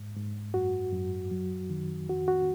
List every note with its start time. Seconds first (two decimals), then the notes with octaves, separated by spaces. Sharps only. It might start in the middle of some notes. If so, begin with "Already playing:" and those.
Already playing: G#2
0.16 G#2
0.54 F#2 F#4
0.93 F#2
1.31 F#3
1.70 D#3
2.09 F2 F#4
2.28 F#4